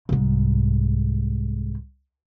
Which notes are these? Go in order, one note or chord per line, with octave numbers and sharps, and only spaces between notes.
C2 G#2